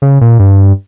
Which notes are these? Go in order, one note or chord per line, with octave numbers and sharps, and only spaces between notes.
C#3
A#2
G2